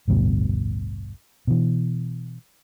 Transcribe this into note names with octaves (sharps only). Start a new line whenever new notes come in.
A1 D2 G2 B2
B2 E3